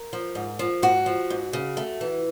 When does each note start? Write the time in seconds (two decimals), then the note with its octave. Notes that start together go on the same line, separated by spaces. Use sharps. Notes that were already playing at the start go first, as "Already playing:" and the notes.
Already playing: A#4
0.13 F3
0.35 G#2
0.59 F3
0.82 G#2 F#4
1.06 F3
1.30 G#2
1.53 C#3
1.77 A3
2.01 E3